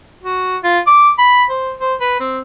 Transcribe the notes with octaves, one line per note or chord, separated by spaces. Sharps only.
F#4
F4
D6
B5
C5
C5
B4
C4